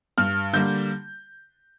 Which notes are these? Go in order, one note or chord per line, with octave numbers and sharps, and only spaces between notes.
G2 F6
D3 G3 A#3 G6